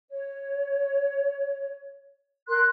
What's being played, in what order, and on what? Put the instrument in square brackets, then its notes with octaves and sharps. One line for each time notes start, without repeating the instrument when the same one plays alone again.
[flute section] C#5
A#4 C6 F#6